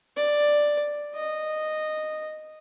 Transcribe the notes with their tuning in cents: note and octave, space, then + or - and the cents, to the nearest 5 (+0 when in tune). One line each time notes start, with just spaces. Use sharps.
D5 +5
D#5 -10